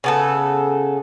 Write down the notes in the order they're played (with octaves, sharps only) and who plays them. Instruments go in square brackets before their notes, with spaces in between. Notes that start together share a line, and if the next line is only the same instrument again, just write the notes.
[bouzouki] C#3 B3 A4